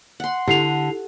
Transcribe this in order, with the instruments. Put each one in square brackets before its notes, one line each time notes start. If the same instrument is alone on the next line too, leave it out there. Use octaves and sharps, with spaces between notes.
[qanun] F#5 C6
[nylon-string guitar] D3 [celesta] E4 C7 F7 [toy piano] G4